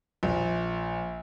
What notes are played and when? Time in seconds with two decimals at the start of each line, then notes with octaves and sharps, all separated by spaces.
0.23 A#1